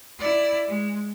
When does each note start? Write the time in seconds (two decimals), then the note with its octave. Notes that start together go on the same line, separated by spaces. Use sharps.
0.19 E4 D5
0.67 G#3